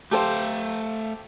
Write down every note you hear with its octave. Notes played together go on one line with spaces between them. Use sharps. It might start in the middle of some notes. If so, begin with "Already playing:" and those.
A3 G4 A4 C5 F5